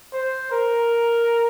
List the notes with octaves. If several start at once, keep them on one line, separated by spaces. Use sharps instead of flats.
C5
A#4